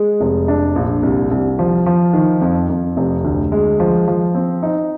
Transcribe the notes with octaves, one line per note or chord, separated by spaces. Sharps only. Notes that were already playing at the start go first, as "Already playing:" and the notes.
Already playing: G#3
F1
D4
A#1
C2
C2
F3
F3
D#3
F2
F2
F1
D2
G#3
F3
F3
C4
D#4